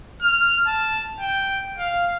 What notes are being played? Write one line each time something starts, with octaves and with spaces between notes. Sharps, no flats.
F6
A5
G5
F5